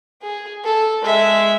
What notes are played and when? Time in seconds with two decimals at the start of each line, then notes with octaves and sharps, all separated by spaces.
0.22 G#4
0.64 A4
1.03 G#3 E5